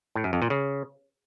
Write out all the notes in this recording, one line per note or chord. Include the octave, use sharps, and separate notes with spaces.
A2
F#2
F2
A#2
C#3